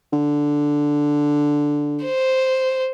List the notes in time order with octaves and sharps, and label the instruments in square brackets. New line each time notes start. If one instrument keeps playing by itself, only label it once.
[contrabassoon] D3
[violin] C5